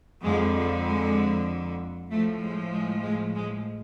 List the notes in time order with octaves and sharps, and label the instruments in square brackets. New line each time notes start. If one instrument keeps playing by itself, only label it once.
[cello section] F2 D3 F3 G#3
F3
G#3
A2 F3 A3
G#3
G#3
G#3
G#3